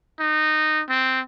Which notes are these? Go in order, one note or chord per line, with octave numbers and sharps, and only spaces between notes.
D#4
C4